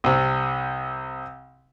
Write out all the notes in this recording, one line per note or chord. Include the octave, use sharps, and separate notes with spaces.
C2 C3